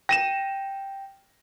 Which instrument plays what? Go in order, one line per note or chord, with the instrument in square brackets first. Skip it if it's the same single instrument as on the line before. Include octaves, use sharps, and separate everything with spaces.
[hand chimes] G5 [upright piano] A#6 D#7 E7